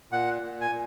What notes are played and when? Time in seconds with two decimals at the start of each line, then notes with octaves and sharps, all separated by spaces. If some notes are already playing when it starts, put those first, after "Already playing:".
0.12 A#2 F#5
0.42 A#2
0.61 G#5
0.71 A#2